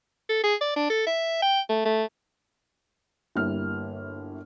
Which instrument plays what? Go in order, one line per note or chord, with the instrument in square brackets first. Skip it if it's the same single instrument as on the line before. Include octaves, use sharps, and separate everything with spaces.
[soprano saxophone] A4
G#4
D5
D4
A4
E5
G5
A3
A3
[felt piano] G1 G3 A#3 E4 F6